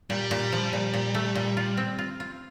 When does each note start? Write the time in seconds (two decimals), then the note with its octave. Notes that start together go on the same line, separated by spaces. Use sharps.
0.10 A#2 G3
0.31 A#2
0.52 F3
0.73 A#2
0.94 A#2
1.15 A3
1.35 A#2
1.57 F4
1.77 C4
1.98 F4
2.20 F4